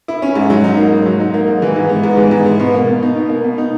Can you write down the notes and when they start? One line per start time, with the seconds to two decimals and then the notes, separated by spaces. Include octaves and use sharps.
0.08 E4
0.22 C#4
0.35 G#2
0.50 F#3
0.64 D#4
0.77 A#3
0.92 G#2
1.06 F#3
1.20 D#4
1.34 A#3
1.48 G#2
1.62 E3
1.76 G#2
1.89 B3
2.03 G#2
2.17 E3
2.31 G#2
2.46 B3
2.59 B2
2.74 A#3
2.87 B2
3.02 D#4
3.16 B2
3.30 A#3
3.44 B2
3.58 D#4